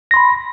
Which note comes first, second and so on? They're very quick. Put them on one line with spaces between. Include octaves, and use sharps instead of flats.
A#6 C6 B5